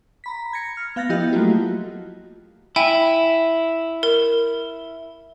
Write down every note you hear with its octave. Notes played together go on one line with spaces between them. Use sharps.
A#5 B5 B6
G#6 A#6 C#7
F6
B3 F5 F#6 A6 A#6
F3 B3 E4 G4 D#5
F#3 A3 A#3 F4 F#4
E4 G5 G#5
A#4